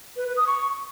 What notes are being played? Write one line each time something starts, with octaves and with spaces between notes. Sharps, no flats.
B4
B4
D#6
C#6